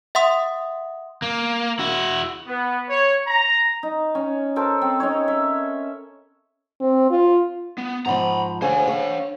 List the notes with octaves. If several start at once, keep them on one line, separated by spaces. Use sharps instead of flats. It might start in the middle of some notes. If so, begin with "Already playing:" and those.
E5 F#5 C6 D#6
A#3
E4 F#4
B3
C#5
A#5
D#4
C#4
A4 A#4 C5 A5
C4
C#4 D#4 C#5
E5
C4
F4
B3
G#2 F3 F#5 A#5 B5
D2 D4 G#4 C5 C#5 F5
C#5